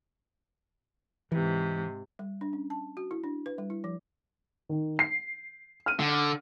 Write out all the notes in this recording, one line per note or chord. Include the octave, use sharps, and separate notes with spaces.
G#2 C3 E3
G3
D4
C#4
A5
F#4
E4
D4
B4
G3
E4
F3
D#3
C7
F6 D#7
D3